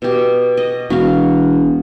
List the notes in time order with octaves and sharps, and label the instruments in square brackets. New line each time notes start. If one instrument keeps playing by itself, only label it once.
[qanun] B2 G4
D#5
[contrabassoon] E1 [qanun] F#4 F5